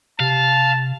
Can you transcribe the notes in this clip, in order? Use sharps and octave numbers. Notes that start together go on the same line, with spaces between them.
C3 F5 A5